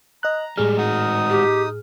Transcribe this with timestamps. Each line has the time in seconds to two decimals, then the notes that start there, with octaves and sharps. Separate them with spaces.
0.23 D#5 A#5 F#6
0.57 A2 G3 G#3 G#4 F6
0.77 G#2 D#4 F#4 D#6
1.30 G4